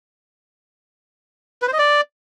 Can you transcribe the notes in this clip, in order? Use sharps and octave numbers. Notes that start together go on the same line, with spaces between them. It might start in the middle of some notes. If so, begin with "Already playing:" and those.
B4
C5
D#5
D5